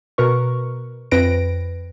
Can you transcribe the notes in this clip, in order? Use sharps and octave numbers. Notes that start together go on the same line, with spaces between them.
B2 A#4 B4 C#6
F2 C4 B4 A#6 D7